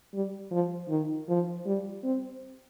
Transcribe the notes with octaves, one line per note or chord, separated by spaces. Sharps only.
G3
F3
D#3
F3
G3
C4